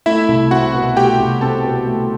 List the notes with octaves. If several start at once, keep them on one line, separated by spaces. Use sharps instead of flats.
A3 E4 E5
C2
C4 F#4 F#5
B2
A3 G4 G5
C2
C4 A4 A5
B2
A3